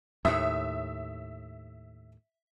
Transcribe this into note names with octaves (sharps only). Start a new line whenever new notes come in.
D#2 A2 E5 D#6